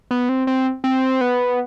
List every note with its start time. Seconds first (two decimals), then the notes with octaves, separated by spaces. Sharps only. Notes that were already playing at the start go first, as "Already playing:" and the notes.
0.11 B3
0.29 C4
0.47 C4
0.84 C4
1.21 B3